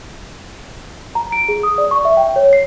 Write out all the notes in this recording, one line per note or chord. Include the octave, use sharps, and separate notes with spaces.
A#5
D7
G#4
D#6
D5
C#6
E5
G5
C#5
C7